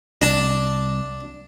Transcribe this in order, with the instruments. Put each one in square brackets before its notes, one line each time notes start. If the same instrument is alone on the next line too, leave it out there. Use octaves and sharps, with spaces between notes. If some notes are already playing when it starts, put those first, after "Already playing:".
[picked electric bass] C2 [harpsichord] D4 A5